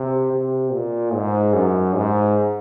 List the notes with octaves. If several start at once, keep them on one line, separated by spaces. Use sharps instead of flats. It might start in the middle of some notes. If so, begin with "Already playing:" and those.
Already playing: C3
C3
A#2
G#2
F#2
G#2